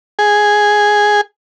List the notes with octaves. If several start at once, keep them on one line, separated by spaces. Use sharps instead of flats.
G#4